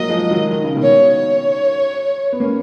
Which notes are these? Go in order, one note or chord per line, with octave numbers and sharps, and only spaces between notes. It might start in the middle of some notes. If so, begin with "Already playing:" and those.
Already playing: F#3 A#3 D#5
F3 G#3
D#3 F#3
D#3
C#3
B2 D#3
C#5
C#5
B3
A#3 C#4